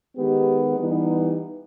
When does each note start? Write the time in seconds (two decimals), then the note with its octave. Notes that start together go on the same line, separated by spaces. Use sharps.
0.17 D#3 G#3 B3 D#4 G4
0.77 E3 G3 B3 D#4